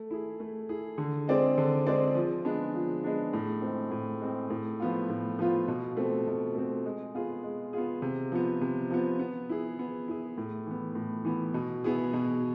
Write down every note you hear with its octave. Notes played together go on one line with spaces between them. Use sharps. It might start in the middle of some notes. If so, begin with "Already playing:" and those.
Already playing: A3
E4 G#4
A3
E4 G#4
D3
G#3 C4 G#4 D5
D3
G#3 C4 G#4 D5
F3
G#3 B3 D4
F3
G#3 B3 D4
A2
G#3 C4
A2
G#3 C4
A2
F3 B3 F4
A2
F3 B3 F4
B2
A3 C4
B2
A3 C4
G#3
B3 F4 G#4
G#3
B3 F4 G#4
C3
F3 B3
C3
F3 B3
B3
E4 G#4
B3
E4 G#4
A2
E3 B3
A2
E3 B3
B2
B3 E4 G#4
B2